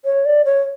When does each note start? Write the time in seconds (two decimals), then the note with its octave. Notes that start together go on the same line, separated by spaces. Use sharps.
0.05 C#5
0.25 D5
0.45 C#5